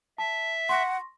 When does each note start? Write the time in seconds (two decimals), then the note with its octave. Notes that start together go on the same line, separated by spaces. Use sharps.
0.18 E5 A5
0.69 F#5 C6 C#6 A#6